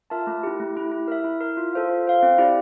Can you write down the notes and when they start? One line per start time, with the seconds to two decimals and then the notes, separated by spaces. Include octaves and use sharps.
0.10 F4 A#4 E5 A5
0.27 A3
0.43 E4 G4
0.60 A3
0.76 E4 G4
0.92 E4
1.08 A#4 E5
1.24 E4
1.41 A#4 E5
1.57 F4
1.73 A4 C5 F5
1.89 F4
2.06 A4 C5 F5
2.23 C4
2.38 E4 G4 D5